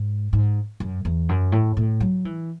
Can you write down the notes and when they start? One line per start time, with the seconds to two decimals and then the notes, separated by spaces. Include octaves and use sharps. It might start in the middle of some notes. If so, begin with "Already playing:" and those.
Already playing: G#2
0.33 G#2
0.80 F#2
1.05 E2
1.29 F#2
1.52 A2
1.77 A2
2.00 F#3
2.25 E3